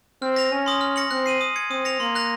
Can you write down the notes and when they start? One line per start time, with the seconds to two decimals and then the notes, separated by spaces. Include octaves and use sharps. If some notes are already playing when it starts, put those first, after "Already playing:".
0.22 C4 F6
0.36 A#6 F7
0.51 C#4 G#5
0.66 C6 D#6 A#6
0.81 F6
0.96 A#6 C#7 F#7
1.11 C4 F#6
1.26 C7 D#7 F#7
1.41 D#6
1.56 G#6 C#7
1.70 C4 D#6
1.85 A#6 C#7 F7
2.00 A#3 C6
2.15 F#6 A#6 F7